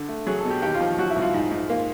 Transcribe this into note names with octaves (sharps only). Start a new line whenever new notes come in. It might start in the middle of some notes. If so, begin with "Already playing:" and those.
Already playing: D3
A3
F#3 G#4
A4
B2
G4
D#2 G4
F4
F3
F#3 F#4
E4
C2
F4
G#2
G#2
A#3